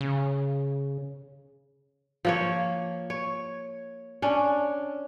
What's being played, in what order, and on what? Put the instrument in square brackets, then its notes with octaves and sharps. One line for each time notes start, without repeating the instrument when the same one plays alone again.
[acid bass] C#3
[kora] F3 A#3 C#5
C#5
C#4 D4